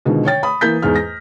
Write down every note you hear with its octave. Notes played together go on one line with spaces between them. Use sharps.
B2 D3 D#3 F3 G#3
C#5 G5 A6
B5 D#6
E3 A#3 G6 B6
E2 G#2 G#4 F6
A#6